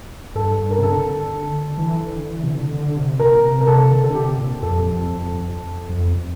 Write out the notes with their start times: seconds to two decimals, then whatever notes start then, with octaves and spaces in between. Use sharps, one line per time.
0.35 G2 A4
0.71 A#4
0.78 C3
0.83 D3 A4
1.78 E3
2.02 D3
2.25 E3
2.43 C3
2.49 D3
2.73 D3
2.96 C3
3.19 A#2 A#4
3.43 C3
3.61 A#4
3.67 C3 A4
3.92 D3
4.04 A4
4.15 C3 G4
4.38 A#2
4.62 F2 A4
4.86 F2
5.10 F2
5.34 F2
5.89 F2